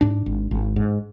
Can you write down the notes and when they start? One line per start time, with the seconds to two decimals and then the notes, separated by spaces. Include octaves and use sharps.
0.01 G#2 D4
0.26 G#1
0.51 G#1
0.76 G#2